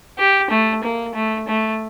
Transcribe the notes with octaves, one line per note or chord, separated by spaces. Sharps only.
G4
A3
A#3
A3
A3